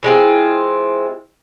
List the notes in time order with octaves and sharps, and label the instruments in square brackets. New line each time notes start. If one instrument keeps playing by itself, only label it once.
[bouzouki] E3 G#3 C4 F4